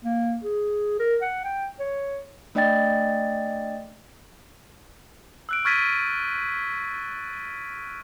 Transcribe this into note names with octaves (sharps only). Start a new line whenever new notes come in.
A#3
G#4
A#4
F#5
G5
C#5
A3 D4 D5 D#5 G5 A6
E6 F#6 D7
C#6 F6 G#6 A6 B6 D#7